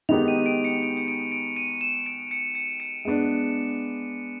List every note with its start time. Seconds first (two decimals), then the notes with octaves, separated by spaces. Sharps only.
0.09 D#3 G#3 B3 D#4 G4 F7
0.28 D#7
0.46 D7
0.64 C#7
0.83 D7
0.97 C#7
1.08 D7
1.32 D7
1.57 D#7
1.81 E7
2.06 D7
2.31 C#7
2.55 C#7
2.80 C#7
3.05 G#3 B3 D4